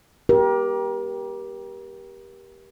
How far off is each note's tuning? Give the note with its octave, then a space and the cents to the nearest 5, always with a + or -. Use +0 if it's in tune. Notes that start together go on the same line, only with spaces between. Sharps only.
G4 +0 A#4 +30